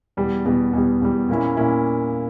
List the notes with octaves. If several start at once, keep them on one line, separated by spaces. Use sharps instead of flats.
E2 B2 G3
E2 B2 G3
E2 B2 G3
E2 B2 G3
A#2 A#3 C#4 E4
A#2 A#3 C#4 E4